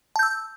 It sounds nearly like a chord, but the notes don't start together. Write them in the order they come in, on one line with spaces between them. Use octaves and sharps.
A5 G6 E6